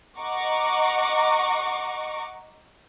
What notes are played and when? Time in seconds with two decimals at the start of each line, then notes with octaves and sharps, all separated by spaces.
0.19 D#5 F#5 A#5 C#6 D6